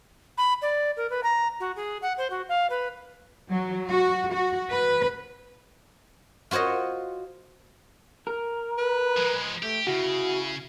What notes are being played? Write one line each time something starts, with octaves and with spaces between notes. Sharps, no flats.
B5
D5
A#4
B4
A#5
F#4
G#4
F#5
C5
F#4
F5
B4
F#3
F#4
F#4
B4
F4 F#4 C5 C#5 D#5
A#4
B4
F3 G#3
A3 G4
C#3 E4 F#4